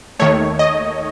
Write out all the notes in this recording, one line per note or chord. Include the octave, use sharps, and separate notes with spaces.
D#2 D#3 A3 C#5
D#5